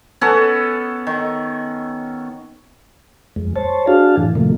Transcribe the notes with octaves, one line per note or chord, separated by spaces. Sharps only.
B3 C#4 A4 F#5
D#3
F2 G#3
C5 C#5 A5
D4 F#4 G#4 F5 A5
F#2 A2 E3
A2 C3 D#3 F3 A3 A#3